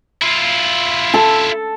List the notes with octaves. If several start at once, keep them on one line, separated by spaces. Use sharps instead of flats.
E4 F4
A4